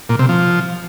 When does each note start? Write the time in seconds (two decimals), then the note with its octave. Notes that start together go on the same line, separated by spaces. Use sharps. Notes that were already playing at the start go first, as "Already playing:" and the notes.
0.09 A#2
0.19 C3
0.29 F3